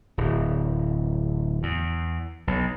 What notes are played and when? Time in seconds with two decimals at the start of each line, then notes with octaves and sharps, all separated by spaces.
0.18 D1
1.63 E2
2.47 B1